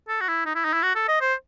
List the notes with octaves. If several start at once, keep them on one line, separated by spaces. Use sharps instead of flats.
A4
F#4
E4
D#4
E4
D#4
E4
F#4
A4
D#5
C5